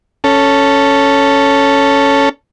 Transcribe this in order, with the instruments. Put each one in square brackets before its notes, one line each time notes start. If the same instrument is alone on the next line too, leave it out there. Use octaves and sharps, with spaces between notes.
[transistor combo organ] C#4 A4